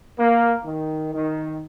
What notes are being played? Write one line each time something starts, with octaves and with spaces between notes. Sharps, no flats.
A#3
D#3
D#3